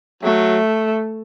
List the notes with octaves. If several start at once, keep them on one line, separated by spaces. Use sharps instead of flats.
F#3 A3